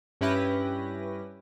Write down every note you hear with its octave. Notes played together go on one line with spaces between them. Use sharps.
G2 C#4 E4 G4 B4 A#6